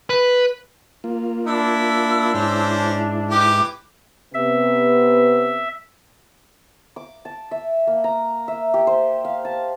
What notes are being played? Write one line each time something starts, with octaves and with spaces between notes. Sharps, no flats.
B4
A#3 F4
D4 E4 E6
G#2 C#4 E4 C5
E3 G4 D6
C3 B3 E5
D6
A5
E5
A#3
A#5
E5
G4
C5
F5
A5